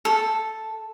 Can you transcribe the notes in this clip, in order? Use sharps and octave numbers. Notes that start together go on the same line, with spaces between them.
A4